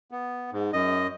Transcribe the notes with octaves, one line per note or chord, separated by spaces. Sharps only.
B3
G#2
F#2 D#5